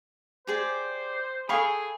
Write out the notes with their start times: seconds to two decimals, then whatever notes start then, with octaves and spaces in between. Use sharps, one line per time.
0.47 G4 G#4 C5 D5
1.49 G#4 A4 F5 G5 G#5 B5 C#6